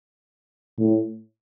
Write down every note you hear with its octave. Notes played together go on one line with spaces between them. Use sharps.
A2